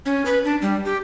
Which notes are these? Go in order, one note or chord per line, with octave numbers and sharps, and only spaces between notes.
C#4
B4
D4
G3
G4